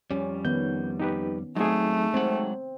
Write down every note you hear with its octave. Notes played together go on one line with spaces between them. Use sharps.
F2 G3 C#4
D#3 B3 G6
D#4 G4 B4
F#3 A3 C4 D#4 G#4
F#3 G#3 C4 F#5